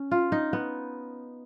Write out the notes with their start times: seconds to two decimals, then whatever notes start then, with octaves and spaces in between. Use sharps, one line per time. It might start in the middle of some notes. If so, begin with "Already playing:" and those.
Already playing: C#4
0.11 F4
0.32 D#4
0.53 B3